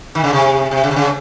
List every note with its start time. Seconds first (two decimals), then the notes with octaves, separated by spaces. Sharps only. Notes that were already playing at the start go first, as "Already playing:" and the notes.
0.15 D#3
0.24 C#3
0.33 C3
0.71 C3
0.84 C#3
0.91 C3
0.96 C#3